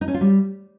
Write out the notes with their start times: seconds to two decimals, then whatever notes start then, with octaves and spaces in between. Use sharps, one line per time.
0.01 D#4
0.08 C#4
0.14 F4
0.21 G3